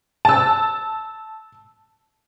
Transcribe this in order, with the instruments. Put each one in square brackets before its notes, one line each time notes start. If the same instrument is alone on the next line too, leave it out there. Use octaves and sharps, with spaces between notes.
[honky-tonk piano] A5 E6